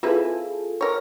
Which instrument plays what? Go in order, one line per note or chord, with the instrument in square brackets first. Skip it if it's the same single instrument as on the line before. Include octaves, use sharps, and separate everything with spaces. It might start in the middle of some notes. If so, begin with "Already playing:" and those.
[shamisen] C4 E4 B4 [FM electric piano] F4 G#4 A4
[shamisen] A#4 C#5